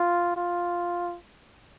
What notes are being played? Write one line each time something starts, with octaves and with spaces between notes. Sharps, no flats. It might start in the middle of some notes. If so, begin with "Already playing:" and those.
Already playing: F4
F4